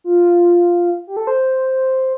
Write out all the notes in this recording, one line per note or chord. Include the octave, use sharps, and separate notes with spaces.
F4
G4
A4
C5